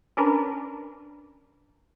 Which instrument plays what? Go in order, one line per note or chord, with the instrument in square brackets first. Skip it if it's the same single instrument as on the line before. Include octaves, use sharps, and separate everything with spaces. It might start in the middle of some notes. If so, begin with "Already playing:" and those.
[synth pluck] C#4 D4 A#4 B4